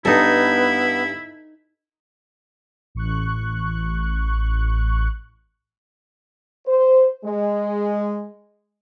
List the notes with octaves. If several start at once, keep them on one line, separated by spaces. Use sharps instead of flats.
G2 B3 D#4 E4 A4
A1 C#6 F#6
C5
G#3